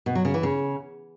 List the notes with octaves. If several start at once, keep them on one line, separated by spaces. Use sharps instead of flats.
B2
F#3
C#3
E3
C#3